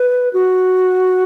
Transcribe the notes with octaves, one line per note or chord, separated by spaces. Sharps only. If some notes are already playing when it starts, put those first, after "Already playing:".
Already playing: B4
F#4